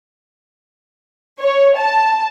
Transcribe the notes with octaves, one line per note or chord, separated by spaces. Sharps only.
C#5
A5